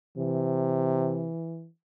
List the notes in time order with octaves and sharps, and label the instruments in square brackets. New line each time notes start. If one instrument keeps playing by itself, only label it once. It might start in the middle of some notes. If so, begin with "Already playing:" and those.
[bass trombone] C3 [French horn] E3